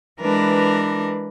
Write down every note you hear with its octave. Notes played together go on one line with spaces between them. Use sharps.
E3 G#3 D4 A#4 B4